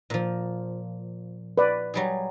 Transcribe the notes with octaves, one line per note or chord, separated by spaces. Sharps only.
A#2 F3
B4 D5
F#3 G3 G#4